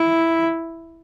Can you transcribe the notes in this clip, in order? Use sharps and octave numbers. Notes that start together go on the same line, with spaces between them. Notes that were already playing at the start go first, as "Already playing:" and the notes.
Already playing: E4